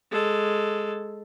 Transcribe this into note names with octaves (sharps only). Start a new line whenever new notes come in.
G#3 A4